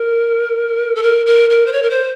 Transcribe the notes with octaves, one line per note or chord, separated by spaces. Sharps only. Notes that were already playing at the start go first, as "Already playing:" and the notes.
Already playing: A#4
A4
A#4
A#4
A#4
C5
C#5
A#4
C5